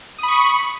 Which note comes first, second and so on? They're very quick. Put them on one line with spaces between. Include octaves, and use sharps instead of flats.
D#6 B5 C#6